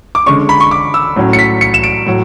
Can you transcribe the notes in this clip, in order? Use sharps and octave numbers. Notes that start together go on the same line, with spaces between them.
D6
D3 G#3 C#4 C#6
B5
C#6
D6
E6
A2 F#3 C#4
C#7
B6
C#7
E7
D7
A2 F#3